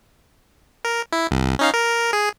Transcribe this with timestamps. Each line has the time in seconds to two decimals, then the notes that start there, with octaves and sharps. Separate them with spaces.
0.85 A#4
1.13 E4
1.31 C2
1.59 C#4 D#4 F5
1.74 A#4
2.13 G#4